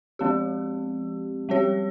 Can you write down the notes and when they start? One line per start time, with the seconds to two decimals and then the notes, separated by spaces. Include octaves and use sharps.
0.19 F3 G#3 C4 G4
1.49 G3 C4 G4 C#5